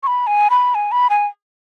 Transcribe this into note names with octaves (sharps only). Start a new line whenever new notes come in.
C#6
B5
G#5
B5
G#5
B5
G#5